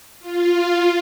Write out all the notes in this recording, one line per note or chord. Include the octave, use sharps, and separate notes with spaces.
F4